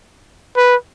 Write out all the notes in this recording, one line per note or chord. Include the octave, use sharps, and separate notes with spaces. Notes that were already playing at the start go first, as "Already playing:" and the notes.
B4